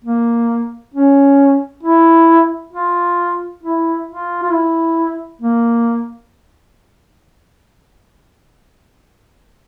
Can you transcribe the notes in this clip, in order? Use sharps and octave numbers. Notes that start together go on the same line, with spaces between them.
A#3
C#4
E4
F4
E4
F4
F4
E4
A#3